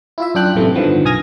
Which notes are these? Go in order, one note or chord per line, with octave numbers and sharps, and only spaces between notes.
E4 F4 E5
F#2 D4 F4 G5 F#6
A1 F#2 C3 E3 A3
G2 D3 D#3 F3 B3
B1 G#5 D#6 F6 G#6 A#6